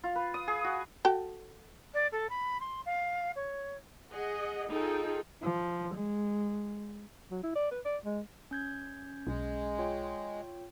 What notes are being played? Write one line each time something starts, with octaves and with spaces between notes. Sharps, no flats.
F4
B4
D#6
G#4
F#4
F#4 A4 G5
D5
A4
B5
C6
F5
C#5
G#4 D#5 F#5
D#4 F4 G#4 A4 G5
F3
G#3
F#3
E4
D5
B4
D5
G#3
C#4 G6 G#6
B1 G#3
F4 C#5 G5